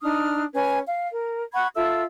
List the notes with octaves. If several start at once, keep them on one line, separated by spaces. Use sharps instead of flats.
D4 D#4 D#6 F6
C#4 B4 G#5 G#6
F5
A#4
F#5 B5 C#6 G#6
F4 A4 E5 E6